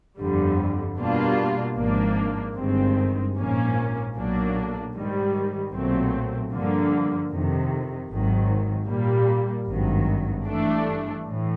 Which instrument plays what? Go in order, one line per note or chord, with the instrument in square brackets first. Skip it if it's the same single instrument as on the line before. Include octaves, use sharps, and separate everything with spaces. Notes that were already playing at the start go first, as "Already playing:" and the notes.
[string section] G1 F2 D3 G3
B2 G3 A#3 D4 F4
G#1 G#2 F3 A#3 D4
G1 G2 D#3 G#3 C4
A#1 G#2 F3 A#3 C#4
B1 A#2 F#3 A#3 D4
G#2 D#3 G3
B1 A#2 F#3 A3 C4
G2 D3 F3 A#3
F2 C3 D#3
G#1 G#2 D#3 F#3
A#2 G3 A#3
G#1 G2 D#3 F#3
G2 E3 A3 D4
A2 E3